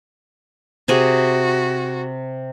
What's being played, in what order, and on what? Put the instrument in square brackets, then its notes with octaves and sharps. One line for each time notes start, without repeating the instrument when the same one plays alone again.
[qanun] C3 G#4 [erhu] F#4